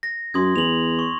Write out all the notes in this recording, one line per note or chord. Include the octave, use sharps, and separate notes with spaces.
A#6
F#2 C6 D#6 G#6
E2 F7 F#7
C#6